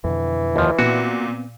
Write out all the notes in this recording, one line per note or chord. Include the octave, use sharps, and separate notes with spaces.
F2 B2 D3 E3
D#2 F3
A#2 B3 C4 F#4